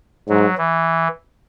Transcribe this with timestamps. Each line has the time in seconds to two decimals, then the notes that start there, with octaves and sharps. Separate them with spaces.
0.29 G#2 F#3
0.58 E3